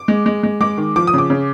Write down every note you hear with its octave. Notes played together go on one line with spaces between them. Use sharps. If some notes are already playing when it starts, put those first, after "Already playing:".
Already playing: D6
G#3
G#3
G#3
G#3 D6
D#3
F3 D6
D#6
C#3 D6
C#3